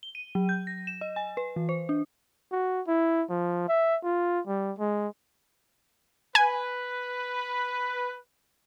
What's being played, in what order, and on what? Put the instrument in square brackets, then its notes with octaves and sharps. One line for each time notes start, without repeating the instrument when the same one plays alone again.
[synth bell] G7
D#7
F#3
G6
A#6
E7
D#5
G#5
B4
E3
C5
D4
[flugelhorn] F#4
E4
F3
E5
F4
G3
G#3
[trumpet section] B4 [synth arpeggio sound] G#5